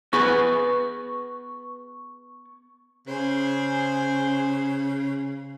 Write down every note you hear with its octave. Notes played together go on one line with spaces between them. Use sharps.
B3 G#4 B4 C#6
C#3 G#4 C5